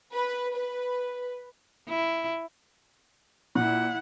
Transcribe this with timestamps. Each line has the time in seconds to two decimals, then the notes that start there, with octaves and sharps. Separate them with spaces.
0.12 B4
0.55 B4
1.89 E4
3.55 A#2 E4 F#5